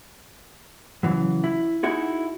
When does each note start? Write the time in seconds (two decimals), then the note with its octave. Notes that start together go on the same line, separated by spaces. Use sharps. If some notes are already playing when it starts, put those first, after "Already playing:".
1.03 C#3 E3 F#3
1.44 E4
1.83 D#4 E4 F#4 G#4